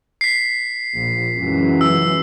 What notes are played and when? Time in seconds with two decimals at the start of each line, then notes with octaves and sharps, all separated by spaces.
0.21 B6 C7
0.95 A#1
1.35 C#2 F#2 E3
1.81 E6